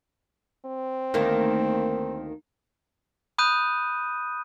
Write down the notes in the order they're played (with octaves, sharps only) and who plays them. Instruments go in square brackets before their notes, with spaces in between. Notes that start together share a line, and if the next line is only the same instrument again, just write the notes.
[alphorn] C4
[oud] D2 D#3 A#3
[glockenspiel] B5 D#6 F#6 G6 D#7